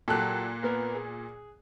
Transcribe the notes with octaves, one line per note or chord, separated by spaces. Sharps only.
A#2 F#3 G4 A4 F#6
A#3 B3 A#4
G#4